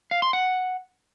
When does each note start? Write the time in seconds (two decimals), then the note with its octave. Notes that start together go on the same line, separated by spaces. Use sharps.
0.11 F5
0.22 C6
0.33 F#5